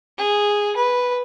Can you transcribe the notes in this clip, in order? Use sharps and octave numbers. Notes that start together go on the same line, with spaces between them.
G#4
B4